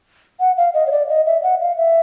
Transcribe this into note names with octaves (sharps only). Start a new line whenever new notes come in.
F#5
F5
D#5
C#5
D5
D#5
E5
F#5
F5
E5